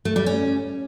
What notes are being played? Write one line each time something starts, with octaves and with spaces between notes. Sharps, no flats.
A3
G3
C#4